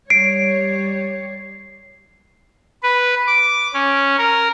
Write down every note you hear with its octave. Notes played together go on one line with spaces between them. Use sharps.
G3 C#5 C7 D7
B4
D6
C#4
A#4